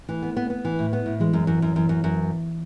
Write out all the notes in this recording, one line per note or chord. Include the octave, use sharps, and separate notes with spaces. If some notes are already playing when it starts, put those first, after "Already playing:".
E3 A3
B3
B3
B3
E3
A2
B3
A2
E3 G#3
F#2
F#2 E3
F#2
F#2 E3
F#2
F#2